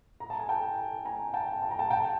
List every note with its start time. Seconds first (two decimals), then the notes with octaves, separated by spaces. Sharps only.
0.20 A#5
0.30 A5
0.39 G#5
0.49 G5 A5
1.05 G#5 A#5
1.34 G5 A5
1.62 A5
1.71 A#5
1.79 G5 A5
1.90 G5 A5